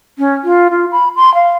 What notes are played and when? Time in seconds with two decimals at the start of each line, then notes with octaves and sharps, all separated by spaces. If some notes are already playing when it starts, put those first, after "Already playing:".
0.18 C#4
0.44 F4
0.71 F4
0.92 B5
1.16 C6
1.34 F5